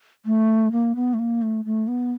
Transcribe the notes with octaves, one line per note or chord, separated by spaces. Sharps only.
A3
A#3
B3
A3
A#3
A3
A3
B3